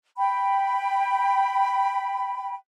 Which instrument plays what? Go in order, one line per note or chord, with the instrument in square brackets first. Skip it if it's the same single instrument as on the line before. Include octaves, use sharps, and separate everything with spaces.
[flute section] G5 B5